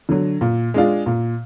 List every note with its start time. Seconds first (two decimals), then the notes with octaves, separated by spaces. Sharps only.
0.09 D3 F#3
0.41 A#2
0.74 G#3 D4 F4
1.06 A#2